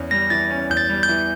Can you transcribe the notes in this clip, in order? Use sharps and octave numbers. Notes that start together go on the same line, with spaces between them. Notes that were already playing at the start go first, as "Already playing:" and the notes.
Already playing: E2 C#4
G3 A#6
E3 A6
C#4
E2 G6
A6
G3
G6
E3